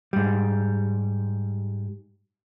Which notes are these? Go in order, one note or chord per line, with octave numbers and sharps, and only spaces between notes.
G#2 G3